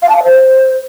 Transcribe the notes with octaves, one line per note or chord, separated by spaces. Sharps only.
F5
A5
F5
C5